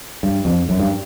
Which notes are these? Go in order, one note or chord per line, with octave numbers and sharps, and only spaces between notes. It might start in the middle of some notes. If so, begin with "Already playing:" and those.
G2
F2
F#2
G2